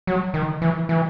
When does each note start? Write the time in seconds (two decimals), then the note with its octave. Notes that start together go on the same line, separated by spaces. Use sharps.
0.07 F#3
0.34 D#3
0.62 E3
0.89 E3